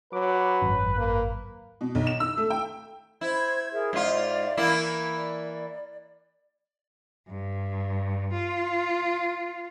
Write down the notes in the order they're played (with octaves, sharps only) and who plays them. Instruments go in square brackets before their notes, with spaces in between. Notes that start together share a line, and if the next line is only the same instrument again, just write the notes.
[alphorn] F#3 [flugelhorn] B4 [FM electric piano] D6
[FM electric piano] G#1 F#2
[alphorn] A#3
[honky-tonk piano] B2
B1
E7
E6
A3
G5
[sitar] E4 [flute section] C5 G#6
[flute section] G#4 A#4 E5
[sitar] G#2 F4 [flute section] D5 E5
[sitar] E3 A#3 E4
[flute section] D5
[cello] G2
F4